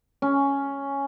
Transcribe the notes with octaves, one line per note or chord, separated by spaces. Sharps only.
C#4